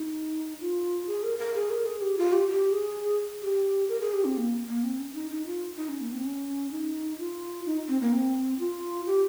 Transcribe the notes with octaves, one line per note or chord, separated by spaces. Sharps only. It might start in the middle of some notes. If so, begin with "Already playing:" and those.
Already playing: D#4
F4
G#4
A#4
A#4
G#4
A#4
G#4
G4
F4
G4
G4
G#4
G4
A#4
G#4
G4
C4
A#3
A#3
C4
C#4
D#4
D#4
F4
D#4
C#4
A#3
C4
C#4
D#4
F4
D#4
C4
A#3
C4
F4
G4